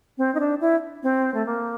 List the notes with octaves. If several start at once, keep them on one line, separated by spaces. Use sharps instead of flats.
C4
D#4
D4
E4
C4
A3
A#3